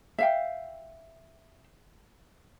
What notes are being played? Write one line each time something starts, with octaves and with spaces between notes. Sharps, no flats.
E5 F5 G5